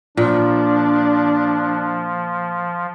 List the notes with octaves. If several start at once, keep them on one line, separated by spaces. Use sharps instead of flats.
A#2 F3 D4